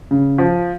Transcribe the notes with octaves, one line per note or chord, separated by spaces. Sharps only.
C#3
F3